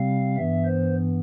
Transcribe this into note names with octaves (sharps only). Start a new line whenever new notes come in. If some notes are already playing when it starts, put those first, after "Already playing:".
Already playing: C3 G3 C4 F5
G2 E3 B3 E5
C5